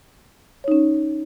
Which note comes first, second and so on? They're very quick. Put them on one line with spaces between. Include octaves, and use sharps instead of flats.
C#5 D#4 C#4